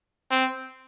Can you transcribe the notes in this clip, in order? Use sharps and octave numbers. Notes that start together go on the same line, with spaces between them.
C4